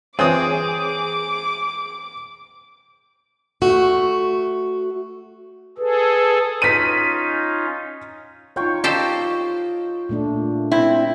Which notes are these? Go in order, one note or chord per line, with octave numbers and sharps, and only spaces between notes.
E3 C4 G#4 B4 C#5 D6 D#6
A3 F#4
G#4 A4 B4
C#4 D#4 F4 B6 D#7
D#4 F4 C#5 G5 C#6
G4 A4 C5 C#5 D#5
A#2 A3 D4
C4 E4